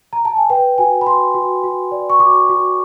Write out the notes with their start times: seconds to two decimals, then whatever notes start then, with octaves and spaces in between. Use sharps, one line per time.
0.13 A#5
0.25 A5
0.37 G#5
0.50 B4 G5
0.78 F#4 G#5
1.01 B5
1.06 F#4 C6
1.35 F#4
1.63 F#4
1.91 D5
2.10 C#6
2.20 F#4 D6
2.49 F#4